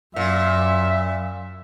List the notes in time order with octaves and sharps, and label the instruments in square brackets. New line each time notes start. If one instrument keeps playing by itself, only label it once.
[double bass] F#2 [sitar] A#2 [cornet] E5